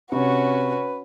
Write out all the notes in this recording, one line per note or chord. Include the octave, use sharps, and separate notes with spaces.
C3 C#4 F#4 B4